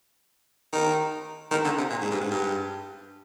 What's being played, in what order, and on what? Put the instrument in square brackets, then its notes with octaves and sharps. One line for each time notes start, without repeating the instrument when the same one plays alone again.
[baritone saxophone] D#3
D#3
D3
C3
A#2
G#2
G2
G#2
G2